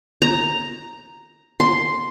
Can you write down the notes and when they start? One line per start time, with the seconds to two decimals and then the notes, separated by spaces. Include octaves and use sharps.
0.22 A#5
1.60 C6